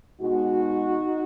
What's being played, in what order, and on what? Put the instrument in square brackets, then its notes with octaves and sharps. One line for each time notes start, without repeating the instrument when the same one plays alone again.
[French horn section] B2 G#3 D#4 F#4